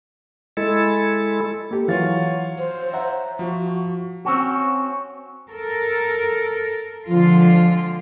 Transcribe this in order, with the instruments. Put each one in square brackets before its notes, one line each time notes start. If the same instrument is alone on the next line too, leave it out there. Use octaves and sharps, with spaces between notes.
[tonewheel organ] G#3 E4 A4
[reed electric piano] A#3 G4 A4
[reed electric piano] E3 A6 [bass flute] F#3 [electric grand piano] F4 C#5 F5
[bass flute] C5
[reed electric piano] E5 F#5 A#5
[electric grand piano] F3 [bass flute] F#4
[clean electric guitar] C4 C#4 F#4
[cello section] A4 A#4
[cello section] D3 G#3 F4 [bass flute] F3